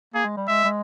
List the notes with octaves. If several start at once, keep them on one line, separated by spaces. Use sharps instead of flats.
A#3 G#4
G#3
G3
G#3 E5
G#3